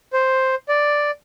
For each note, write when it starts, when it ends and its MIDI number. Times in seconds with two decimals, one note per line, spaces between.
0.13 0.55 72
0.69 1.11 74